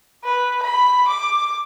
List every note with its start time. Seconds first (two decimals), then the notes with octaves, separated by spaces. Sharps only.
0.24 B4
0.63 B5
1.08 D6